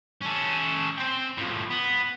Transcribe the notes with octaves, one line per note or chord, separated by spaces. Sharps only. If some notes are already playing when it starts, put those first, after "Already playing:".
C#4 A4
C4 G5
A2 F3
B3